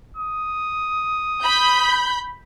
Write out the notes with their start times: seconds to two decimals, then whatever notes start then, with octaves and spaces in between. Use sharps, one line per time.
0.17 D#6
1.43 B5 G6